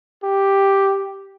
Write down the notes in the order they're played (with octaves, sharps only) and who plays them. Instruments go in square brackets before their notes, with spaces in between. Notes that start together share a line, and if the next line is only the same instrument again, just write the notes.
[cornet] G4